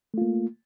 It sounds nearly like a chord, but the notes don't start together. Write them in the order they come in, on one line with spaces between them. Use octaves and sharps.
A3 F4 A#3